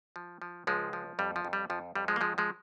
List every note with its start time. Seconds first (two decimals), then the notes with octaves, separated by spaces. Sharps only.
0.16 F3
0.42 F3
0.67 C#2 F3 G#3
0.93 F3
1.19 F2 G3
1.36 F3
1.45 F2
1.53 G3
1.70 F2 F3
1.95 F2 G3
2.08 F3 G#3
2.16 A#3
2.21 F3 G#3
2.38 F3 G#3